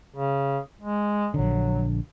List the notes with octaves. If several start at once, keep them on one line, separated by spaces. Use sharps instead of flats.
C#3
G#3
A#1 D3 F#3